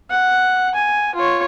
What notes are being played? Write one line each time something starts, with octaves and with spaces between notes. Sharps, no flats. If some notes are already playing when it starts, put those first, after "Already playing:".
F#5
G#5
F4 C#5